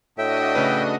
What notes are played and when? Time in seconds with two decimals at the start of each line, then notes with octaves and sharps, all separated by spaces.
0.18 A2 D4 F#4 D#5 E5 G5
0.55 C#3 A3 B4